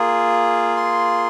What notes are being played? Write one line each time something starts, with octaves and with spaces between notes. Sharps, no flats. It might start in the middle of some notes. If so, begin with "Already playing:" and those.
Already playing: A#3 F4 G#4
C6